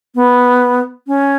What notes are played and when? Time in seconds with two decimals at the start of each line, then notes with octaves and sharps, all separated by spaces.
0.15 B3
1.07 C#4